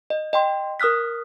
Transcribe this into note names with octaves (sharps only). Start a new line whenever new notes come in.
D#5
D#5 G5 C6
A#4 D#6 F6 F#6 B6